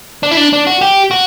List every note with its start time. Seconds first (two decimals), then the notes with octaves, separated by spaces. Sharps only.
0.23 D4
0.31 E4
0.37 D4
0.53 D4
0.67 F#4
0.81 G4
1.11 F#4